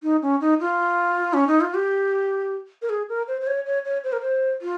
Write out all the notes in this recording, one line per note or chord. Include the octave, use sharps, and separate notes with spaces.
D#4
C#4
D#4
F4
C#4
D#4
F4
G4
A#4
G#4
A#4
C5
C5
C#5
C#5
C#5
C5
A#4
C5
F4